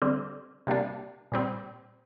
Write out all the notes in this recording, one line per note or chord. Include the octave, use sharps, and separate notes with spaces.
D3 G3 C4
C3 G3 A#3 D4
A#2 G3 C4